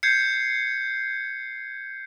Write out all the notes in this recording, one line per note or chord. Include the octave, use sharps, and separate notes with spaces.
G6 G#6 C7 C#7